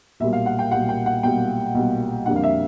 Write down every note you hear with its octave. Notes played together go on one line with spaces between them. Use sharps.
B1 A#2 G3 E5
F5
F#5
G5
B1 A#2 G3 F#5
G5
F#5
B1 A#2 G3 G5
B1 A#2 G3
F2 D3 G3 A#3 D4 F#5
F5
E5